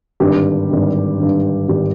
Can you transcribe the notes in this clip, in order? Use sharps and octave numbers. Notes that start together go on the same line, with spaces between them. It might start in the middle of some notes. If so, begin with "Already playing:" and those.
G#1 G2 D3 G4
G#1 G2 D3
G#1 G2 D3
G#1 G2 D3 G4